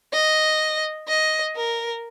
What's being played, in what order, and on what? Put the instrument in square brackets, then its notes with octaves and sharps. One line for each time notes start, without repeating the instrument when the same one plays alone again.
[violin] D#5
D#5
A#4